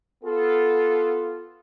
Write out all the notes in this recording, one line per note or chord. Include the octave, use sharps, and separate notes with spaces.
B3 F4 A4